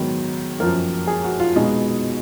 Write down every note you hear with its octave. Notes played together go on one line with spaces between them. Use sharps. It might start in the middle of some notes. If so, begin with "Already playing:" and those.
Already playing: G#2 D#3 F#3 B3
F#2 F3 A#3 A#4
G#4
F#4
F4
B2 G#3 B3 D#4